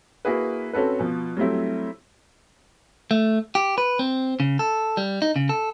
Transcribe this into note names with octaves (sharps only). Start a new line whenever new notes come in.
A#3 E4 F#4 G#4 B4
C4 C#4 F#4 A4 B4
B2 F3
F#3 G3 A3 C4 E4
A3
G4
B4
C4
C#3
A4
G3
D#4
C#3
A4